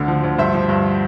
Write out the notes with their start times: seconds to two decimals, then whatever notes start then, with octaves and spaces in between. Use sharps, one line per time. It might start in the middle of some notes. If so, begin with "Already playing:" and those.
Already playing: D2 D3
0.08 F3
0.24 D2
0.38 G2 C5 E5
0.54 F3
0.69 G2